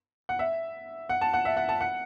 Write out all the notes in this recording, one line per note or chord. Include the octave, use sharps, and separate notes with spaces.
F#5
E5
F#5
A5
F#5
E5
F#5
A5
F#5